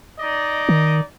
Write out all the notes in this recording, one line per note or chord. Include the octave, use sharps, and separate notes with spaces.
D#4 D5 D#5
D#3